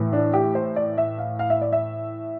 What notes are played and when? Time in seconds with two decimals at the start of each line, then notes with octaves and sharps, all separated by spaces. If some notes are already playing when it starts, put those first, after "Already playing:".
Already playing: A2 E3
0.13 D4
0.34 G4
0.55 C5
0.76 D5
0.98 E5
1.18 F5
1.39 F5
1.50 E5
1.61 D5
1.72 E5